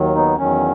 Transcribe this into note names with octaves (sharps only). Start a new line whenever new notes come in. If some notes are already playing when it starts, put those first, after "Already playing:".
Already playing: D#2 D#3 F#3
B3 D#4
E2 D#3 F#3 C#4